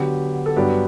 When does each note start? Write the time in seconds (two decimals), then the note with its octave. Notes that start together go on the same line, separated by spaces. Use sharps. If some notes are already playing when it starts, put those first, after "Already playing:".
Already playing: D3 F#3 B3 G4
0.46 A4
0.56 G2 F#3 B3 D4 G4